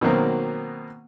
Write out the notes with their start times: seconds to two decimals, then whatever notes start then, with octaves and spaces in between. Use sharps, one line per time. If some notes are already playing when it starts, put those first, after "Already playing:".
0.01 B2 D#3 F#3 A#3 C4